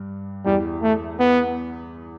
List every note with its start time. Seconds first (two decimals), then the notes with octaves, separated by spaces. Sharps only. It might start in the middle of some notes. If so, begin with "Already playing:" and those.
Already playing: G2 G3
0.46 E2 E3 G3
0.82 A3
1.19 B3